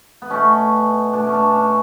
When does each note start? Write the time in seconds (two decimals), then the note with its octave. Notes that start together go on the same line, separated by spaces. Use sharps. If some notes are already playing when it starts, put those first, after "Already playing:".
0.22 B3
0.30 B2 A3 C#4
1.13 B2 A3 D4
1.27 C#4
1.34 D4
1.55 C#4